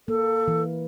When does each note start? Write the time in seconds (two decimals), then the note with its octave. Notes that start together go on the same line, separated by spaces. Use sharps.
0.08 A#3 A4
0.48 E3